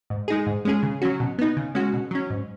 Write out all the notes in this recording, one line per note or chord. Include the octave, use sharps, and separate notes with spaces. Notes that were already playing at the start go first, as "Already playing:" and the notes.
G#2
G#3 D#4 G#4
G#2
G#3 C#4 G#4
C#3
F#3 C#4 F#4
B2
B3 D#4
C#3
G#3 C#4 F#4
B2
F#3 C#4
G#2